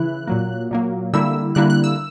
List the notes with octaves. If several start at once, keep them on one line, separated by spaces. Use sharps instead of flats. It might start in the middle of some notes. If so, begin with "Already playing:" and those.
Already playing: C#3 E3 E4 F#6
A#2 F#3 A#3
A#2 F#3 A#3
D3 G3 A#3 E4 E6
D3 G3 A#3 E4 F#6
F#6
E6